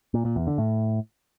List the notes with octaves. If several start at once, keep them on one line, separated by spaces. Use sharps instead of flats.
A#2
A#2
E2
D3
A2